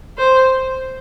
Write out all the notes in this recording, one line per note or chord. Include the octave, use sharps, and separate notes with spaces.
C5